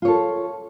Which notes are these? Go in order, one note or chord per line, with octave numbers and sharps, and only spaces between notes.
F4 A4 C#5